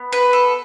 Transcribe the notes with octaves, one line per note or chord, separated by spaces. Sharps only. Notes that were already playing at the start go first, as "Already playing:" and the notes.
Already playing: B3
B4
A4